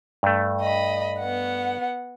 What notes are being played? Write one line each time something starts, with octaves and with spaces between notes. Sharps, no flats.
G2 A3
D#5 B5
B3 F#5